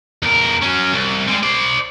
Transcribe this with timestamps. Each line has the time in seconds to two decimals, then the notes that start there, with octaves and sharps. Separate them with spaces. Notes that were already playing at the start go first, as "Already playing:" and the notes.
0.22 E2 A#4
0.61 F#3 C#4
0.93 C2
1.27 G3 G#3
1.43 C5 D5